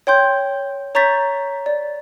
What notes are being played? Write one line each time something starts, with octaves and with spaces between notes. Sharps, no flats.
C#5 G5 C6 G6
C#5 A#5 C#6 G6 A6 B6
D5